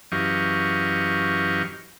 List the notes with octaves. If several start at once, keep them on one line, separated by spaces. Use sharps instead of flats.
F#2 E3 G4 D#5 F5 C#6